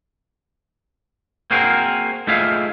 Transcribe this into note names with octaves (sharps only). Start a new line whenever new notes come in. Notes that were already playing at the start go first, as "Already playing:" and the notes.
A#3 C4 F#4 G#4 A#4
A3 D#4 F4 G#4 E5 F5